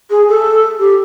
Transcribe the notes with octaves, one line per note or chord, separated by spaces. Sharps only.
G#4
A4
G4